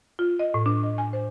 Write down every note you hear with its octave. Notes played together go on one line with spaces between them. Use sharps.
F4
D#5
A2
D4
D#5
G#5
C5